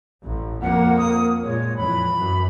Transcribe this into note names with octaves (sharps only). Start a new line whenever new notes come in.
A1
F2 A#3 F#5
D#6
A#2 G#3 C#5
F2 E3 B5
F#2